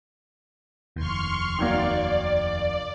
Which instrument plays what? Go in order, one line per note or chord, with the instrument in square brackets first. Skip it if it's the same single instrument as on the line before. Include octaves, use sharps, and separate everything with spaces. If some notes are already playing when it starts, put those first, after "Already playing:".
[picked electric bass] F1 D#2 [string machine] C6 C#6 F6
[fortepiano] D#3 F#3 A#3 [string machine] D5